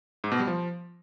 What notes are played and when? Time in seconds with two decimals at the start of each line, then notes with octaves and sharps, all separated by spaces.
0.24 G#2
0.32 B2
0.39 G3
0.47 F3